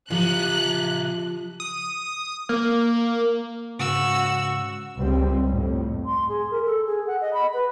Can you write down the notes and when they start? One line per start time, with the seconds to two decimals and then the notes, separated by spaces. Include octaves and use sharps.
0.10 C#3 F3 G4 A#5 F#6
1.60 D#6
2.49 A#3
3.79 G#2 C#3 F#4 E6
4.99 C#2 G3 C4
5.49 F2 A2
6.06 C6
6.29 G#4
6.51 A#4
6.66 A4
6.86 G#4
7.07 F#5
7.21 D#5
7.33 B5
7.54 B4